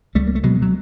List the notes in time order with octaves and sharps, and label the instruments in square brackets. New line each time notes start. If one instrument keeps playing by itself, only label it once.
[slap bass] C#2 G3 A3
A#3
A3
B2 F#3 G#3
F#3